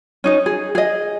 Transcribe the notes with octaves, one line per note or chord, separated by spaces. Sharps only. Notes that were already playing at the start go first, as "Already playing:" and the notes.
C#4 D#4 D#5
G#4
G#4 D#5